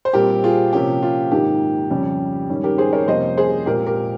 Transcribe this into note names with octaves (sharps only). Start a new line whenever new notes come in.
C5
A#2 G3 C4 G4 A#4
F4 G#4
C3 F3 A#3 C#4 G4
F4
G#2 D#3 A#3 G4
F2 C#3 G3 C#4
G#2 D#3 G3 C#4
G4 A#4
G#4 C5
A#4 C#5
F2 C3 G3 A#3 C#4 C5 D#5
G#4 C5
A#2 G#3 C4 G4 A#4
G4 A#4